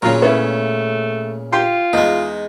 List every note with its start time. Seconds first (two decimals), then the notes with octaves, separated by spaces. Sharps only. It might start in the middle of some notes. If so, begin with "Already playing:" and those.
0.02 A#2 C#3 F#3 F4 A#4
0.22 A3 B3 C#4 E4
1.52 F4 G4 G5 C6
1.93 E2 G#3 D#4